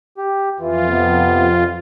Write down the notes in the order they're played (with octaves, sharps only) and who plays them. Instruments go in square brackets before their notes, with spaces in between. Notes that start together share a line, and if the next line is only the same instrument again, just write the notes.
[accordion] G4
[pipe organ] F2 F4 [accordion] E3
[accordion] C3 B3